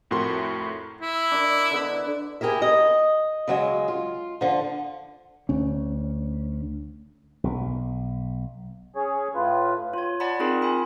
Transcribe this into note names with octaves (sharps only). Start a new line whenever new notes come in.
F2 A2 F#4 A#4 C6
E4
D4 A#4 D#5
D3 B3
E4 G4 G#4 A#4 E5
D#5
C#3 F#3 G#3
F4
D3 F3
D2 C#4
B1
C#4 G#4 C#5
A2 F4 B4
F4 C#5
D5 F#5 A5 B5
C4 D#4 F4 G#4 A#4
F4 G#5 B5